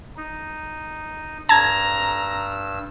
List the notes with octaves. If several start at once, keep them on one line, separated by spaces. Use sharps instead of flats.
D#4
G2 A5 A#5 E6 G#6